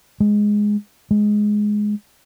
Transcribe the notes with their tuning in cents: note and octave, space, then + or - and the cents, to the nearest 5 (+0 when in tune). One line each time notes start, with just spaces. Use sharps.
G#3 +0
G#3 +10